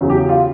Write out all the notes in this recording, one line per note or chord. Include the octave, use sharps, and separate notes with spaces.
E2 C#3 F#3
G4
F4